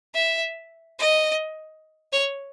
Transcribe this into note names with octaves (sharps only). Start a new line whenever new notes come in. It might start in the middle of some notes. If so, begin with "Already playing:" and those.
E5
D#5
C#5